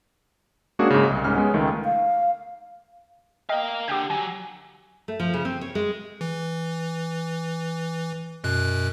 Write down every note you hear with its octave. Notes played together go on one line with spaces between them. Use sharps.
G#3 A#3 C#4 D4 F#4 G#4
G#2 C#3
C2
C2 G#2 C#4 F6
G#3 B3 C#4
C#2 D#3 A3
F5
A#4 D#5 F5 G5
D3 G4 G5 G6
F#3 G#5
A3
F3
C#3
C4
C#5
G#3
E3
F#2 B2 F#6